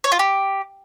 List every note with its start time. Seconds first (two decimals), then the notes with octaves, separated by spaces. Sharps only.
0.04 C#5
0.12 F4
0.19 G4